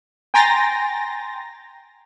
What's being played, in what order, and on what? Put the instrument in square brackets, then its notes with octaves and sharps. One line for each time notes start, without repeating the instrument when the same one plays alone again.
[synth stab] G5 G#5 A#5 C6 A6 A#6